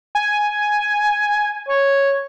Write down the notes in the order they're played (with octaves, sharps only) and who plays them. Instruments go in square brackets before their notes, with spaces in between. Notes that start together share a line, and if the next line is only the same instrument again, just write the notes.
[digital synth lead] G#5
[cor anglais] C#5